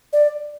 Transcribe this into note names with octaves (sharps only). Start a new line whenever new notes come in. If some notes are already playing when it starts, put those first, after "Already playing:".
D5